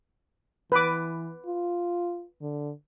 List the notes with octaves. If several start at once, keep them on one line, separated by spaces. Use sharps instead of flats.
E3 B4 D6
F4
D3